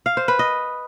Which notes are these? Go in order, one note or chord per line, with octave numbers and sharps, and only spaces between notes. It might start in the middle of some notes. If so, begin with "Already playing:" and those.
F5
C5
B4
D#5